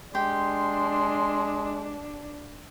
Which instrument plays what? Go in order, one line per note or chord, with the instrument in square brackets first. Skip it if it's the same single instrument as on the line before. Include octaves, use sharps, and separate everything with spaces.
[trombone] G#3 [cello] D4 [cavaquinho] G4 [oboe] C6